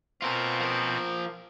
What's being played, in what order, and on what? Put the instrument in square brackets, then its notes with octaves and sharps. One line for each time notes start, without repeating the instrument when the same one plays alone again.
[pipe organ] B2 C4 [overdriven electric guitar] F4 A#4
[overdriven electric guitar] F3 A#4